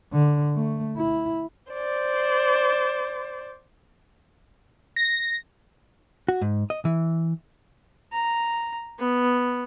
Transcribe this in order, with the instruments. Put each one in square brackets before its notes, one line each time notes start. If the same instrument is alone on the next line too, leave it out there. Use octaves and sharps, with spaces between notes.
[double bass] D3
A3
E4
[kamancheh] C5 D5
[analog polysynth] A#6
[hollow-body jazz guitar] F#4
G#2
D#5
E3
[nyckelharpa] A#5
B3